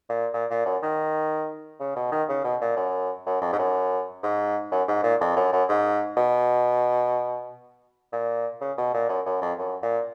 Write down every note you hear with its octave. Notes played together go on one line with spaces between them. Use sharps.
A#2
A#2
A#2
F#2
D#3
C#3
B2
D#3
C#3
B2
A#2
F#2
F#2
F2
G#2
F#2
G#2
F#2
G#2
A#2
F2
F#2
F#2
G#2
B2
A#2
C#3
B2
A#2
F#2
F#2
F2
F#2
A#2